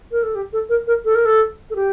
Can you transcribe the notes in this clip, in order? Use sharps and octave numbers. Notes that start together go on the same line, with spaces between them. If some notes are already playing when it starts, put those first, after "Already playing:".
A#4
A4
G4
A4
A#4
A#4
A4
A#4
A4
A4
G4